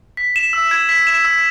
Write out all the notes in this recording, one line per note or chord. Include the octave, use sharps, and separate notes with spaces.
B6
E7
E6
G#6
B6
E7
E6